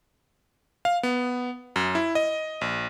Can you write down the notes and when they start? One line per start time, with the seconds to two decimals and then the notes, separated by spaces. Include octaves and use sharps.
0.85 F5
1.03 B3
1.76 F#2
1.95 E4
2.15 D#5
2.61 A#1